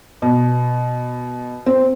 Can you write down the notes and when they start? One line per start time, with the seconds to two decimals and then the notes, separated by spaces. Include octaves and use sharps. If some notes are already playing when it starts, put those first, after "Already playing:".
0.22 B2
1.66 C4